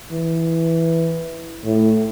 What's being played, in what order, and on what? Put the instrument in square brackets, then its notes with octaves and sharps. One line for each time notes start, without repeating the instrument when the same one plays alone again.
[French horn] E3
A2